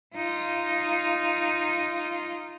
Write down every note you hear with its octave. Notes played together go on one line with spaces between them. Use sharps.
D#4 F4